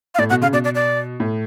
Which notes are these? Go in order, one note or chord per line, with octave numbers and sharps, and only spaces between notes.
F5
A2 D5
B2 F#5
C#3 F5
B2 D5
D5
D5
A2